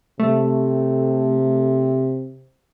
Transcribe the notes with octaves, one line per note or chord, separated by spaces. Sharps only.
C3 A3